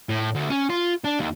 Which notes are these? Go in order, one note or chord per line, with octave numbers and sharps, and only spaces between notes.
A2
D2
C#4
F4
D4
D#2